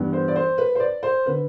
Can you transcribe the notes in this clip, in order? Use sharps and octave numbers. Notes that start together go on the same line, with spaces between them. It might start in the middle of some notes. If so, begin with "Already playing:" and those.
Already playing: G2 E3 G3 B3
C5
D5
C5
B4
C5
D5
C5
D3 B4